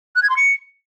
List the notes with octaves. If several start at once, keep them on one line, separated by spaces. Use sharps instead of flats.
F#6
G#6
C6
C#7